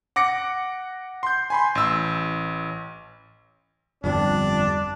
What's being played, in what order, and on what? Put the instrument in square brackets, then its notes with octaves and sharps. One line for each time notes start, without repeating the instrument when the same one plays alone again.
[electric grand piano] F#5 D6 A#6 C#7
C6 G6
G#5 B5 C6
A1 E6
[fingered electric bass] G1 F2 G3 [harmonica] D4